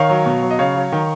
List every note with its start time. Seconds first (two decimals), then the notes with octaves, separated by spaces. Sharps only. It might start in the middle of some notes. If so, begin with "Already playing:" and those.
Already playing: D#3 C#5 F5
0.09 F#3
0.26 B2
0.42 F#3
0.50 D#5
0.59 C#3 C#5 F5
0.75 F#3
0.92 D#3